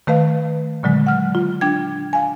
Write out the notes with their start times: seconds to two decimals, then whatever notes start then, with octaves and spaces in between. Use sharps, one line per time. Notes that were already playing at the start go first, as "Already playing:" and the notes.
0.07 D#3 A3 B4 F5
0.83 A#2 D3 F#3 G#3
1.07 F#5 F6
1.35 F4
1.61 D4 G5 G#6
2.13 F5 G#5